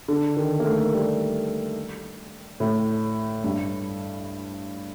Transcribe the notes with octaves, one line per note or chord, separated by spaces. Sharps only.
D3
D#3
A#3
A3
G3
A2
G2